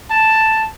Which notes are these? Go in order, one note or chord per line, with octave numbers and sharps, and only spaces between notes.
A5